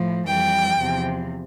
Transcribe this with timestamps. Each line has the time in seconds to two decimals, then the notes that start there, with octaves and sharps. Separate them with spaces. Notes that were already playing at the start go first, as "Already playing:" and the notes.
Already playing: A2 F3
0.26 F2 E3 G3 G5
0.77 E2 C3 F3